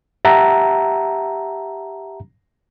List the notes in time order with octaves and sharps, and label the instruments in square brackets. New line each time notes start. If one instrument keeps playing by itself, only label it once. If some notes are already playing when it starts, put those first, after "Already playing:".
[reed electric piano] G4 E5 F#5 A5 A#5